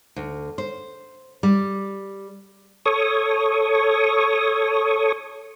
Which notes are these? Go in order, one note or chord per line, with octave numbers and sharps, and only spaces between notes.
D2
C5
G3
A4 C#5 C#6 D#6